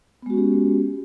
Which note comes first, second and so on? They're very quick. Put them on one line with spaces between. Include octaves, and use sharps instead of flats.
B3 G#3 F#4 C#4 G4